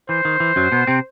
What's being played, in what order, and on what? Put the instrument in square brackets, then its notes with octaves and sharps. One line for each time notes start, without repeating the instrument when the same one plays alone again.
[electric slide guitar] E3 [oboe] C5
[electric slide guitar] D#3
E3
F#2 F#3
B2 B3
C3 C4